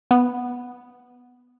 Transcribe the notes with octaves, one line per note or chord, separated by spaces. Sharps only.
B3